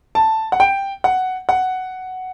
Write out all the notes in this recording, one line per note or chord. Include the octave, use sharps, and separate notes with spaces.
A5
F#5
G5
F#5
F#5